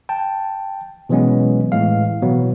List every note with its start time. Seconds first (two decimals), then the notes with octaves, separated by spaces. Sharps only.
0.09 G5 A5
1.09 B2 E3 F#3 G#3 B3 C#4
1.72 A2 E3 G#3 F5
2.22 B2 E3 F#3 B3